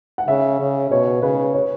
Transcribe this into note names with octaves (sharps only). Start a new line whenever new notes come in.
F#5
C#3 E5
C#3
B2 C#5
C#3 B4
C#5